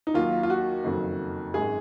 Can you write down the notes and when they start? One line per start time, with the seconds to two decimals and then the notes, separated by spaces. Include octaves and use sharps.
0.07 D#4
0.14 D#2 D#3 F#3 A#3 F4
0.43 F4
0.50 F#4
0.84 F#1 F2 D#3 F#3
1.54 G#1 F#2 D#3 G#3 G#4